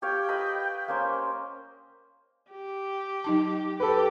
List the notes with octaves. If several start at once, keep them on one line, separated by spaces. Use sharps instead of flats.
G4 C#5 F5 G5
B4 D#5 B5
A#3 C#4 C5
G4
F#3 D#4 A5
G4 A4 B4